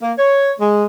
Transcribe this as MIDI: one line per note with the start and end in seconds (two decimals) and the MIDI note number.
0.02 0.13 58
0.18 0.53 73
0.60 0.85 56